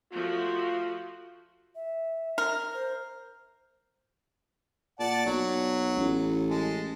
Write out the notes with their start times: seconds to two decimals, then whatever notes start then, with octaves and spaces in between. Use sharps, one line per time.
0.13 F3 A3 F4 F#4
1.75 E5
2.38 A#4
2.74 C5
4.99 A#2 D5 F#5 A5
5.26 B1 F#3
5.96 A1
6.50 G#3 A5